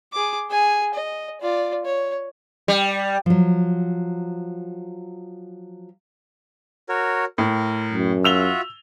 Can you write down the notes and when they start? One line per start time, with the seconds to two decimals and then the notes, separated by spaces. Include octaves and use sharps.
0.13 G#4 D6
0.49 G#4 G#5
0.94 D#5
1.41 F4 D5
1.85 C#5
2.68 G3
3.26 F3 F#3
6.89 F#4 A#4 C#5
7.38 A2 A#4
7.93 F#2
8.24 F4 F#4 E5 E6 F7 G7